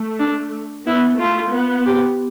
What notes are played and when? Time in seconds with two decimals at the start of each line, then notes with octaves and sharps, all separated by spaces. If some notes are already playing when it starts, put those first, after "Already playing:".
Already playing: A3
0.20 D4
0.87 B3 E4
1.19 A3 F4
1.52 B3
1.86 G4